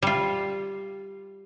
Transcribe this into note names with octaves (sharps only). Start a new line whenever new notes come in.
G3 F4